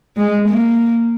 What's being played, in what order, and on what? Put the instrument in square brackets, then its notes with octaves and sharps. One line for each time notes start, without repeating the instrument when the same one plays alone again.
[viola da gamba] G#3
A#3